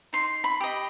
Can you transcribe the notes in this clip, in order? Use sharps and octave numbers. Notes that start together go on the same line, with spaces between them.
D#4 C6
B5
G4 D#5